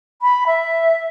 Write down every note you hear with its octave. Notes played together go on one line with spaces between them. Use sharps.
B5
E5